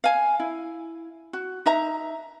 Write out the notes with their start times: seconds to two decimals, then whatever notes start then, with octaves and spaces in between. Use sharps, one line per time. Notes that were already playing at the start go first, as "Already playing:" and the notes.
0.04 F5 G#5
0.40 E4
1.33 F#4
1.66 D#4 E5 A#5